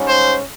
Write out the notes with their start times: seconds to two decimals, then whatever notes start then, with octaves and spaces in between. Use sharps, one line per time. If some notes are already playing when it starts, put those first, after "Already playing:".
Already playing: G#2 G3 C#4
0.09 C5